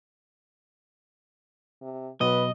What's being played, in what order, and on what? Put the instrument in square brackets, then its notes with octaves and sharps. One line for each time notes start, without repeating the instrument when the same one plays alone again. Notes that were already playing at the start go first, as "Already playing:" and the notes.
[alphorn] C3
[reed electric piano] B2 F#3 [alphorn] B4 [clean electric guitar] D#5